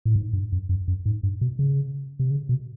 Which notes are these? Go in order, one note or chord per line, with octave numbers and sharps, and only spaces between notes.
A2
G#2
G2
F#2
F#2
F#2
G#2
G2
B2
C#3
C3
C#3
B2